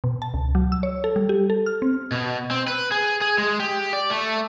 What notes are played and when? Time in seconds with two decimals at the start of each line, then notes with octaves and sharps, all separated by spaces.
0.04 B2
0.22 A5
0.34 C#2
0.55 F#3
0.72 E6
0.83 C#5
1.04 A4
1.16 G3
1.29 G4
1.50 A4
1.66 F6
1.82 C4
2.12 B2
2.51 C4
2.67 B4
2.91 G#4
3.21 G#4
3.38 G#3
3.60 G4
3.93 D5
4.10 A3